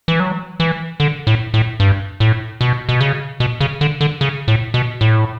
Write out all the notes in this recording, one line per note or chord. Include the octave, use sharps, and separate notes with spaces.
E3
F#3
E3
D3
A2
A2
G2
A2
B2
B2
C#3
B2
C#3
D3
D3
C#3
A2
B2
A2